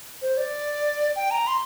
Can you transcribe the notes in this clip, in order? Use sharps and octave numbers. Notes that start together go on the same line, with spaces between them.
C5
D5
G5
A#5
C6